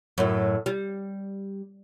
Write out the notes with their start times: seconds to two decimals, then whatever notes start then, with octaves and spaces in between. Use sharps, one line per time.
0.18 F#2 A2
0.66 G3